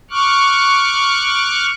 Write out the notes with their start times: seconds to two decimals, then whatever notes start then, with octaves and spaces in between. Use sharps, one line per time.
0.11 C#6 D6 F6 F#6